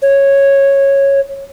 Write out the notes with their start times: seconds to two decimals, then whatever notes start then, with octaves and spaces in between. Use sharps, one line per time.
0.02 C#5